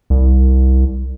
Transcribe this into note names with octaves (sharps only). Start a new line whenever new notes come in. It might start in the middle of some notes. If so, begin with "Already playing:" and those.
C2